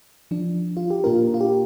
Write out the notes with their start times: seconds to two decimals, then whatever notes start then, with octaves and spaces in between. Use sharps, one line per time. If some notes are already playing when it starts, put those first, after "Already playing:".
0.31 F3 D4
0.77 F4
0.90 G4
1.04 A#2 A#3 D4 F4 A#4
1.34 F4
1.41 G4